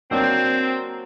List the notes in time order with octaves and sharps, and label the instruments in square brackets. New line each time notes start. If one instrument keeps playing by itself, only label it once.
[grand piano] F#3 A#3 D4 [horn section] C4